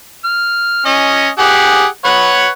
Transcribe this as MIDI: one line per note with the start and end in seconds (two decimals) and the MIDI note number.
0.25 0.81 89
0.86 1.28 61
0.86 1.28 75
1.39 1.85 67
1.39 1.85 68
1.39 1.85 78
2.05 2.48 71
2.05 2.48 73
2.05 2.48 78